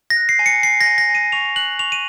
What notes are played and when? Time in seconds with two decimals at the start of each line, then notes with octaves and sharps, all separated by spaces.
0.10 A#6
0.16 F#6
0.29 C7
0.39 G#5
0.46 C#7
0.63 G#5 C7
0.81 A#6
0.86 G#5
0.98 A#6
1.09 G#5
1.15 D#7
1.32 C#6 F7
1.56 F#6 F#7
1.79 C#6 F7
1.92 D#7